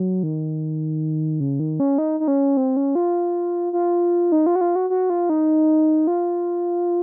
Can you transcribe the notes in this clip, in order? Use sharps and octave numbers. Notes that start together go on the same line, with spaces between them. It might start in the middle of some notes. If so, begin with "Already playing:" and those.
Already playing: F#3
D#3
C#3
D#3
C#4
D#4
D#4
C#4
C4
C#4
F4
F4
D#4
F4
F#4
F4
F#4
F#4
F4
D#4
F4